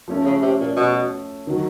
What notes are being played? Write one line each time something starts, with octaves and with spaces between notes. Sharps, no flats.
F3 A3 C#4
C#3
C3
A#2
B2
D#3 F#3